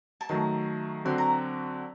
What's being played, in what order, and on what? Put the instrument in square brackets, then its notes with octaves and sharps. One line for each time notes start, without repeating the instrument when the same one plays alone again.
[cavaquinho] A5
[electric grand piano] D#3 F#3 A3 [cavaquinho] A#5
[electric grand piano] D3 F#3 C4 F#4 [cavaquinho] C6
[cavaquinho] A#5